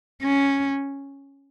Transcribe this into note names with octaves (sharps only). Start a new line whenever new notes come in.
C#4